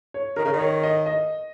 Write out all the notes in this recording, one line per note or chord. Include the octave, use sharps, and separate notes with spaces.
C#5
D#3 A#4
C#3
D#3
C#5
D#5
D#5